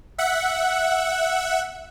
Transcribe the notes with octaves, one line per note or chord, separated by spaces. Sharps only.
E5 F#5